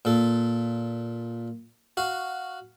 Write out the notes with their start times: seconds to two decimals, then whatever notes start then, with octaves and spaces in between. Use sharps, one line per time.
0.05 A#2 A4
1.97 F#4 F5